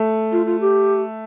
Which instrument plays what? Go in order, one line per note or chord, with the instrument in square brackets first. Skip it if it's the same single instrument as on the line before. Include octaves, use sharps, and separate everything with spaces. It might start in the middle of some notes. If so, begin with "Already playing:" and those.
Already playing: [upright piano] A3
[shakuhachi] F4
F4
G4